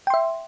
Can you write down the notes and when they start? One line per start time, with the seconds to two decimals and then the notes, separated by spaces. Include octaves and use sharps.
0.07 G5
0.10 C6
0.14 E5